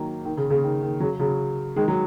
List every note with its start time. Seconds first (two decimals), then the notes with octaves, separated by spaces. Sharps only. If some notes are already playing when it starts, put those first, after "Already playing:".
Already playing: D#3 F#3 A#3
0.25 D#3
0.37 C#3
0.50 C#3
0.64 D#3
0.82 D#3
1.00 C#3 F#3
1.20 C#3 F#3
1.76 D#3 G#3
1.88 F#3